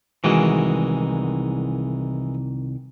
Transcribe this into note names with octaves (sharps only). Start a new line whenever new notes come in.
C2 D#3 E3 G#3 F#4